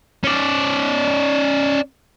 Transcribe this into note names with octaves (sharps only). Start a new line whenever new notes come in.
C#4 D5